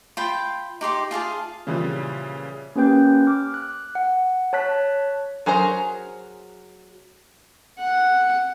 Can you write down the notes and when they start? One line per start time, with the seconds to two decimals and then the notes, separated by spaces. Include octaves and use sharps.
0.17 F4 G5 B5
0.81 D#4 G4 C6 D6
1.11 F4 G#4 F5 A5
1.67 A#2 C#3 E3 F3 G3
2.76 A#3 C#4 G4 B4 G5 G6
3.27 D6 F6
3.54 F#6
3.95 F#5
4.53 C#5 A5 F#6 B6
5.46 F#3 G#4 A#4 C5 A#5
7.78 F#5